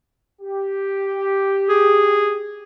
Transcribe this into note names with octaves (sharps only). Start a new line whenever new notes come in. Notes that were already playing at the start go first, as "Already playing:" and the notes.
G4
G#4